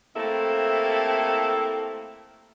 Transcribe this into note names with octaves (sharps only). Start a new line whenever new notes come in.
A3 A#3 C4 E4 G4 A4